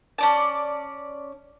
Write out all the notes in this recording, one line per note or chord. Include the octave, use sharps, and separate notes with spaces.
C#4 D5 A5